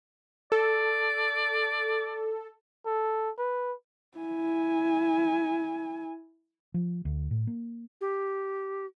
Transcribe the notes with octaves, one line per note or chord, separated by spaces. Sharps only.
A4 D5
A4
B4
E4 G#5
F3
D2
A2
A#3
G4